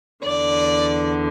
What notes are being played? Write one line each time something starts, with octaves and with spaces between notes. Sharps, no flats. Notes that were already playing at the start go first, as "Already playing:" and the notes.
E2 D3 D5